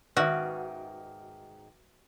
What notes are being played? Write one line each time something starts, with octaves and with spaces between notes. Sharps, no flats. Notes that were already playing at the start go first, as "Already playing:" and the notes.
G#2 D#3 F#4 B4 E5